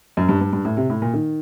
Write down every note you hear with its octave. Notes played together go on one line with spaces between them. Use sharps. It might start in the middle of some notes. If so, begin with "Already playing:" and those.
F#2
G2
G2
G2
A2
C3
A2
A#2
D#3